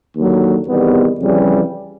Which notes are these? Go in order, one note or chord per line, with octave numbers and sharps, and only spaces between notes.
D#2 D3 F#3
E2 C3 D#3 G3 B3
F2 C#3 E3 G3